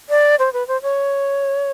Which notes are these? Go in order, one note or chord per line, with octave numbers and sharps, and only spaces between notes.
D5
C5
B4
C5
C#5